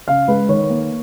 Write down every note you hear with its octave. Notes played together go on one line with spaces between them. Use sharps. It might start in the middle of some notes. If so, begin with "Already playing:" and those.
C#3 F5
G#3 B4
D#3 C#5
A#3